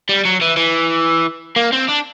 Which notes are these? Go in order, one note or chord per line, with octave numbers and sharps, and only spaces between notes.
G3
F#3
E3
E3
A#3
C4
D4